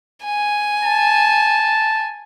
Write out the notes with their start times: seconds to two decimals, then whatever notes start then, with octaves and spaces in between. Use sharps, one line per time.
0.24 G#5
0.84 A5